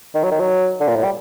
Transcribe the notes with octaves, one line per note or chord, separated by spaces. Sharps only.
D#3
F#3
D#3
F#3
D3
A#2
A2
G3